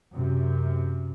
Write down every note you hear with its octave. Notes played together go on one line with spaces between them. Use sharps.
F#2 C3